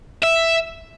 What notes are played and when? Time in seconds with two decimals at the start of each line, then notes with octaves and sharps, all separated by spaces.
0.24 E5